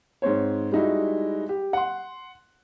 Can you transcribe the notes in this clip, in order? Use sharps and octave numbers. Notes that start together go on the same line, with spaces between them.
G#2 C4 C5 C#5
G3 G#3 D#4 E4 F#4
G4
F#5 C6